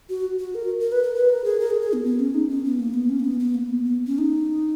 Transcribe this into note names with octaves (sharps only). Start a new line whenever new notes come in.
F#4
F#4
A#4
A#4
B4
A#4
B4
A#4
G#4
A#4
G#4
G#4
B3
B3
C#4
D#4
C#4
B3
A#3
B3
C#4
A#3
B3
B3
A#3
B3
B3
C#4
D#4